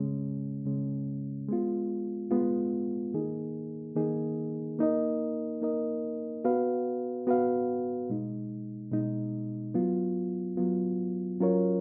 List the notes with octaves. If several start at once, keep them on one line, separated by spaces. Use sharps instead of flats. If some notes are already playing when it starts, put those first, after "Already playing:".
Already playing: C#3 G#3 C#4
C#3 G#3 C#4
G#3 B3 F4
G#3 B3 F4
D#3 A#3 D#4 G#4
D#3 A#3 D#4 G#4
A#3 D#4 A#4 D#5
A#3 D#4 A#4 D#5
B3 F#4 B4 F5
B3 F#4 B4 F5
B2 G#3 D#4
B2 G#3 D#4
F#3 B3 F4
F#3 B3 F4
F#3 C#4 F4 A#4 C#5